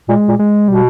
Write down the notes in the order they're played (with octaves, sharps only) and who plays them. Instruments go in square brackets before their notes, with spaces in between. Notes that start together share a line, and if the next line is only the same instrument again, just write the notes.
[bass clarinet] A#2 [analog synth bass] G#3
[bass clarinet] A#2
[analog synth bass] G#3
[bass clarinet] B2 [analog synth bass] G3